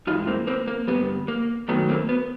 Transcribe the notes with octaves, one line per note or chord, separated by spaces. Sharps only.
G2 E3 G#3 D#4 F4
A#3 C4
A#3 C4
A#3
G2 D3 G3 B3
A#3
F#2 D#3 F#3 A3 B3
A#3 C4
B3